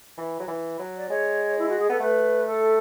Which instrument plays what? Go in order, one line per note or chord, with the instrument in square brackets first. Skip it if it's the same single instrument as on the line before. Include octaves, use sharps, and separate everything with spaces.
[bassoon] E3
F#3
E3
F#3
[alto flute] D5
[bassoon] G#3 [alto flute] C#5
[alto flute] E4
F#4
G#4
[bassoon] B3 [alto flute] A4
[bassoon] A3 [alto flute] B4
[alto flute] A4